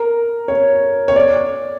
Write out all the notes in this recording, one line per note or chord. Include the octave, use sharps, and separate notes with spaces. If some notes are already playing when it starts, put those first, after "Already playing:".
Already playing: A#4
C#5
C#5
D5